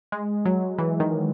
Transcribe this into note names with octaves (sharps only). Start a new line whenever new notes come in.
G#3
F#3
E3
D#3